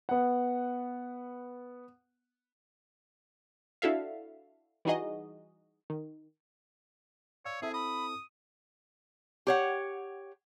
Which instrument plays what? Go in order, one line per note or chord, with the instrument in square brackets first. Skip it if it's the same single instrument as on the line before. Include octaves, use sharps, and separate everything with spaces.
[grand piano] B3 F#5
[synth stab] D4 E4 F#4 A4 E5 F5
E3 G3 D#4 F#4 G#4 D#5
D#3
[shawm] C#5 [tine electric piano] D5 F5 E6
[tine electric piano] C4 E4 A4 [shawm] G#4 [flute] E5
[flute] B5 [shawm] D#6
[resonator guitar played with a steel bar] G4 C#5 F#5